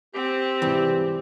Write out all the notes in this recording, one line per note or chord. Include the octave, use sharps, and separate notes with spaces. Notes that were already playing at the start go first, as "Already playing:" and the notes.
C4 G4
G#2 C3 E3 G3